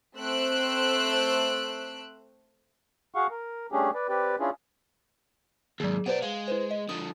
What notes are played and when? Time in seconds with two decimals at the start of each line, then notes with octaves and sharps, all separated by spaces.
0.17 A3 C4 C5 E6 F#6 D7
3.15 F#4 G#4 F5 F#5 C#6
3.31 A#4
3.72 G3 A3 C#4 D4 G4 G#4
3.94 B4 D5
4.09 C4 G4 B4 D5
4.40 C#4 D4 E4 F4 G#4
5.80 D#2 G#2 F#3 G#4
6.06 B2 B4 C5 D5 F#5
6.22 G#3 F5
6.48 E4 B4 C5
6.71 D#5
6.89 D3 F3 D#6